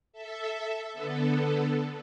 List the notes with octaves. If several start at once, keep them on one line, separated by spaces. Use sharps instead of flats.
A4 E5
D3 B3 A4